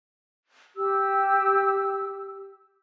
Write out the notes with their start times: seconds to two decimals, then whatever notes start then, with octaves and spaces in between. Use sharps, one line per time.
0.76 G4 E6